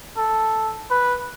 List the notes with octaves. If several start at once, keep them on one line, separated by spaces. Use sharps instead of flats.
A4
B4